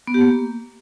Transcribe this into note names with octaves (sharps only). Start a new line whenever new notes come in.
B3
G4
A#3